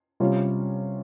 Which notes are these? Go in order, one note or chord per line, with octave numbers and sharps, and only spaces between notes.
C3 G3 C#4 F4